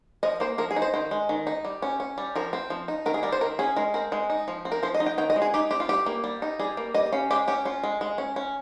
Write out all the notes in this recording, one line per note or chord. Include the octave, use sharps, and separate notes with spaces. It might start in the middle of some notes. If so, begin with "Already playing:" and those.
F3 D#5
A#3 C5
F3 A#4
G#4
D#4
C5
D#3 C5
G#3
D#3
D#4
G3
C#4
C#4
G3
F3 A#4
C4
F3
D#4
D#3 A#4
G#4
G3 A#4
C5
D#3 A#4
C#4 G#4
G#3 A#4
C4 A#4
G#3
D#4
F3
C4
A#4
F3 C5
D#5
D#4
G5
D#3 G5
D#5
G#3
G#4
D#4 G4
C4 G4
F4
G3 G4
A#3
G3
D#4
G3 G#4
A#3
G3 D#5
C#4 F5
G#3 G4
C#4 G4
C#4 F4
G#3
G#3
C#4
C#4